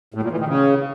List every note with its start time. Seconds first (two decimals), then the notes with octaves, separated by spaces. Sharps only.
0.14 A2
0.23 A#2
0.31 E3
0.40 D#3
0.48 C#3